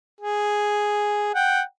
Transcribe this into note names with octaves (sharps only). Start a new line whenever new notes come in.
G#4
F#5 G5